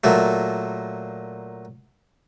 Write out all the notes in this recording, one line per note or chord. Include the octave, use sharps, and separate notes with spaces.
A#2 F#3 A3